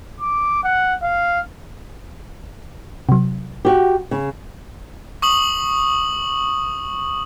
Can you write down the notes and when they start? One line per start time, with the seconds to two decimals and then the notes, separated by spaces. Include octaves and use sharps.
0.20 D6
0.64 F#5
1.02 F5
3.09 C3 F#3
3.65 F#4 G4
4.11 C#3
5.22 C#6 D#6 F#7